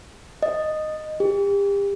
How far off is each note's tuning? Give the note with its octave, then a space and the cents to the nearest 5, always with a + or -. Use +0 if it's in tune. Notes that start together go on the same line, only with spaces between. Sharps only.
D#5 -10
G4 +35